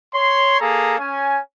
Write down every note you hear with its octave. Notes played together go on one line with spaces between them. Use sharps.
C#5 C6
A#3 G#4 A4 A#5
C#4 G#5